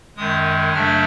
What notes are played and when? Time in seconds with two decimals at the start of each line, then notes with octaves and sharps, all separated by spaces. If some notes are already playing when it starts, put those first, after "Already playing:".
0.17 F#2 D#3 G#3 D#6
0.74 F#2 C#3 F#3 A3 D4 F6